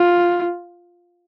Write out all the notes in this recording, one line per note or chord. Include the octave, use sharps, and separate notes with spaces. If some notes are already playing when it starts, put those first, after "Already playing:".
Already playing: F4